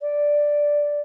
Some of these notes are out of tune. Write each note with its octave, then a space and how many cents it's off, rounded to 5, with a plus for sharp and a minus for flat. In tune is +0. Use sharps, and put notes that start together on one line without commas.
D5 +0